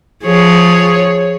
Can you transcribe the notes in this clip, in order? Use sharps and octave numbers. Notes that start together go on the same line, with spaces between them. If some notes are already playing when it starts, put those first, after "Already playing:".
F3 G#4 C#5